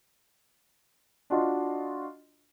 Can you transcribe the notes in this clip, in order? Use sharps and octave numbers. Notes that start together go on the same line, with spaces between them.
D4 F4 F#4 D#5 C6